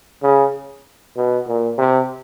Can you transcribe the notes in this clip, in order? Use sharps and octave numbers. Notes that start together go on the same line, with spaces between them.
C#3
B2
A#2
C3